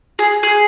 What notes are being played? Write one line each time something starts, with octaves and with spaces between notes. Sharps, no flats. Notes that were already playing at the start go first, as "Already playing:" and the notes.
G#4
G#4